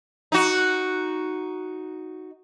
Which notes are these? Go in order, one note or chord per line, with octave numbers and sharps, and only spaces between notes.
D#4 F#4